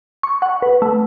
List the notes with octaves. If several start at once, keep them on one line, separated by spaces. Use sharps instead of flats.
C#6
F#5
B4
A3